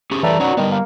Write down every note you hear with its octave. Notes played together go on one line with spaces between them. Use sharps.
C#4 G4 G#4
E3 G3 A3 A#4 B4 D5 A#5
F#3 C#4 D#4 F#4
D#3 G3 B3
A#3